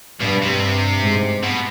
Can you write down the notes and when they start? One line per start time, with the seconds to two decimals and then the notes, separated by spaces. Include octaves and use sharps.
0.21 G2 B2
0.43 C3
1.03 G#2
1.44 B2